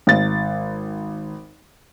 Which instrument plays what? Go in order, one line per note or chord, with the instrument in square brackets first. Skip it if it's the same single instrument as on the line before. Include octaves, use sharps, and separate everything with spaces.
[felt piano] G#1 A6